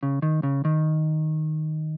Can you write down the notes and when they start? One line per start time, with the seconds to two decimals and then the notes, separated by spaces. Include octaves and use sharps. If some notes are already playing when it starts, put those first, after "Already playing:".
0.03 C#3
0.22 D#3
0.43 C#3
0.65 D#3